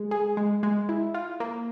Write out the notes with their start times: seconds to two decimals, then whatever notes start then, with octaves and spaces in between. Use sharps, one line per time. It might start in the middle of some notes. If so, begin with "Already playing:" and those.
Already playing: G#3
0.11 G#4
0.37 G#3
0.63 G#3
0.89 E4
1.14 F4
1.40 A#3